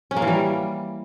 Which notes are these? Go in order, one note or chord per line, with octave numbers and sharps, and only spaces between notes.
C#4
A#3
E3
G3